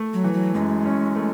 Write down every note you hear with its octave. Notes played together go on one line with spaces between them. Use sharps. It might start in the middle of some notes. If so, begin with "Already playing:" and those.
Already playing: A3
F#3
E3
F#3
F#2 G#3
C#4
A3